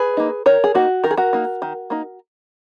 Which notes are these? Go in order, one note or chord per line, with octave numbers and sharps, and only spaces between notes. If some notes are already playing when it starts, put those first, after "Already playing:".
Already playing: G#4 B4
A#3 D#4
D#3 A#4 C#5
G#4
A#3 D#4 F#4
D#3 A#4
G#4
F#4 A#4
A#3 D#4
D#3
A#3 D#4